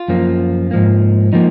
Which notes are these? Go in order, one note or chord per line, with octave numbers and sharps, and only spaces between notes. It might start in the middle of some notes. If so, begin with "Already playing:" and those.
Already playing: F4
F#2 F3 A#3
G#2 F3 A#3
F3 A#3 D#4